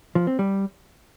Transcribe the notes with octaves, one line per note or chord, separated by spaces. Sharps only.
F3
C4
G3